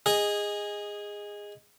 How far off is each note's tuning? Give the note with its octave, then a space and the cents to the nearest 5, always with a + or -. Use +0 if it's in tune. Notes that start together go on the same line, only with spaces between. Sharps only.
G#4 -15 D#5 +0